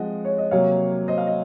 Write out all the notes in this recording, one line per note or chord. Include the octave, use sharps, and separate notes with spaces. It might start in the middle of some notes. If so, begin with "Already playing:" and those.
Already playing: F3 G#3 C4 D#5 F#5
C#5
D#5
C3 F#3 A#3 C#5 F5
C5 D#5
F5
D#5